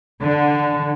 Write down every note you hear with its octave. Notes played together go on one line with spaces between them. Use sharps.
D3